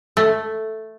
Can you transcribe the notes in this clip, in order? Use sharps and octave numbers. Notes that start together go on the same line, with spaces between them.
A3